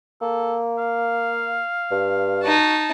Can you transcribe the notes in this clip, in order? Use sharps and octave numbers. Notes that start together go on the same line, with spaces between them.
A#3 A4
F5
G2
D#4 F#4 A5